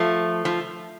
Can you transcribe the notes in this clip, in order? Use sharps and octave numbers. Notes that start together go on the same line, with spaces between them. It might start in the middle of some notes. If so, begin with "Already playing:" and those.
Already playing: F3 A3
F3